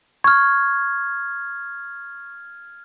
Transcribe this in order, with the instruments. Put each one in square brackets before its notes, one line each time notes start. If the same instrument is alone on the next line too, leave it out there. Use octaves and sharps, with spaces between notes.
[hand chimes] C#6 [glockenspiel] F6 G#6